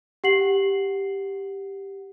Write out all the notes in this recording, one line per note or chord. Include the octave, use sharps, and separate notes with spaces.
G4 F#5 C7 F#7